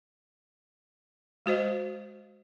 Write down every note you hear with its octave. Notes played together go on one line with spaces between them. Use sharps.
G#3 F#4 C5 D#5